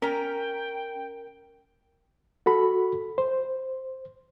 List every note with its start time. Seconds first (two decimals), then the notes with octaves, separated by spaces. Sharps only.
0.02 C#4 A#4 G5 A#5
2.46 F#4 A4 B5
3.18 C5